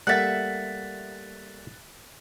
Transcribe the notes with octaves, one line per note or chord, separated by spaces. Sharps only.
G3 A3 A#3 E5 F#5 F#6 A6